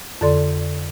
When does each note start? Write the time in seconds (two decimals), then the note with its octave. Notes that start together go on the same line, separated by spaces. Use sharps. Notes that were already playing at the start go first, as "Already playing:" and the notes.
0.21 F2 D3 A4 D5 C6